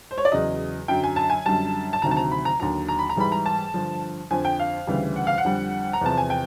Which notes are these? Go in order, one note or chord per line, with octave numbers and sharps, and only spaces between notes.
C5
C#5
D5
E2 C#3 F#3 D#5
F#2 D3 F#3 G5
G#5
A5
G#5
F#2 D3 G3 A5
A5
D2 C3 D#3 F#3 A#5
A5
A#5
B5
A#5
D#2 D3 F#3 A#5
A#5
B5
A#5
G#2 E3 G3 B5
A#5
A5
G2 D3 F3
F2 D3 F3 G#5
G5
F5
D2 C#3 E3 G3
F#5
F5
F#5
F2 D3 G3
A#5
E2 C3 F3 A5
G#5
G5